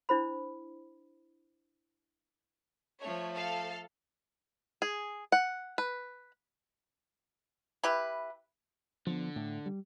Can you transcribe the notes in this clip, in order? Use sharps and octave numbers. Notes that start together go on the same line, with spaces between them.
D4 E4 C5 B5
F3 A3 C#5
A4 F5
G#4
F#5
B4
E4 G4 B4
D3 F3 B3
A2
G3